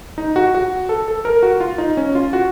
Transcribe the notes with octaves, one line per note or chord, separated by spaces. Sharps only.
D#4
F#4
F#4
A4
A4
A#4
F#4
F4
D#4
C#4
F4
F#4